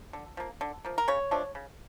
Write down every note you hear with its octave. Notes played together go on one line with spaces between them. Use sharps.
D3
F3 A#3
D3
F3 A#3
A#4
C#3 C#5
F3 A3 D4
C#3